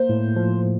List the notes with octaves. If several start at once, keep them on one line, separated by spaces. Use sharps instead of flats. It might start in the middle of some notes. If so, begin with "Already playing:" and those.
Already playing: A#3 C5
A2
F3